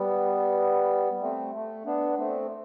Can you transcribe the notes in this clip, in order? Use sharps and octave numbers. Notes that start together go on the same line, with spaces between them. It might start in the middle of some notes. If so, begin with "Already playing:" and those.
Already playing: G3 B3
A3 C4
A3
B3 D4
A3 C4